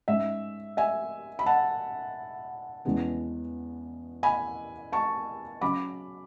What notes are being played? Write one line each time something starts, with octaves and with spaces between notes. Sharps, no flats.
G#2 G#3 C#4 E5
E5 G#5
B5
F#5 A5
E2 C#3 G#3 B3
G#5 B5
A5 C#6
C#3 F#3 C#4 B5 D6